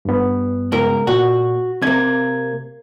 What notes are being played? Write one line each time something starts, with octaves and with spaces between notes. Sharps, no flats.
G2 B3
C#2 A#4
A#2 F#4
C3 A#3 G#6